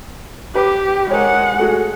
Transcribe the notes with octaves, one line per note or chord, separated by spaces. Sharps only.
G4 B4 D6
G#3 A#4 C#5 F#5
A3 F#4 G#4